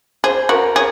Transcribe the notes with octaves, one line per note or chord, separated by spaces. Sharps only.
G#4 C5
F#4 A#4
G#4 C#5